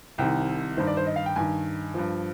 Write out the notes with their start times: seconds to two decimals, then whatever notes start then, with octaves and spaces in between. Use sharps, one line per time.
0.18 C2 C3 D#3 G5
0.77 G2 D#3 C5
0.87 D5
0.97 C5
1.06 D#5
1.16 F5
1.26 G5
1.36 G2 D#3 G#5
1.94 G2 F3